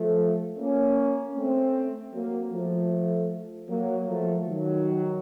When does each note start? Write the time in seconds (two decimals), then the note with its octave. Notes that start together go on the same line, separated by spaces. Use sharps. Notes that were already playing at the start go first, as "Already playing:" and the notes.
Already playing: F3 A3
0.59 A#3 C#4
1.36 A3 C4
2.13 F#3 A#3
2.53 F3 A3
3.69 F#3 A#3
4.08 F3 A3
4.47 D#3 F#3